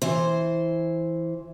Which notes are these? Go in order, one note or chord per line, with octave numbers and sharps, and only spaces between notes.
E3 C5